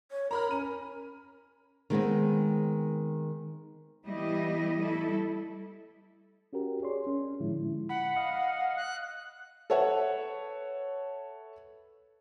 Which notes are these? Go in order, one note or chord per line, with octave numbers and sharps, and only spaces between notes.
C#5
A#4 A#5 B5 F6
C#4 D#7
D#3 G#3 B3 C4
E3 G3 B3 E4 G4 D#5
G3 A3 E4 A4
C#4 F#4 G4 A#4
G#4 C#5 D5 C6
C#4
A2 D3 F3 G#3 E4
F#5 B5
D#5 F5
F#6
A4 B4 C#5 E5 F#5